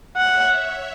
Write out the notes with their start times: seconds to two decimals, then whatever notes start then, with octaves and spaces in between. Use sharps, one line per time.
0.17 C#5 E5 F#5